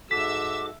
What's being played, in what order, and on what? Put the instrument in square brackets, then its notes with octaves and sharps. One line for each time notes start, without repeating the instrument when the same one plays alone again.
[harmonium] G#2 F#4 A4 [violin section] E5 E6 [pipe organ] D6 [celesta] B6